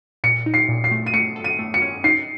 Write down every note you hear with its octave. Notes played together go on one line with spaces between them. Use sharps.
A#2 C#7
D#4
C7
A#2
C7
A3
D#7
A3 C#7
A4
D#7
A3
C#7
C#4
D#4 C7